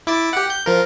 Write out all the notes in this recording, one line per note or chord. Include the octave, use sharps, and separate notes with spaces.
E4 D6 A6
G4 F#5
G6
F3 A#4